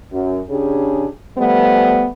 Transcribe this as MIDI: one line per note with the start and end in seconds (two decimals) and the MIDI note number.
0.11 0.38 42
0.49 1.06 49
0.49 1.06 62
0.49 1.06 67
0.49 1.06 68
1.36 2.07 53
1.36 2.07 55
1.36 2.07 57
1.36 2.07 59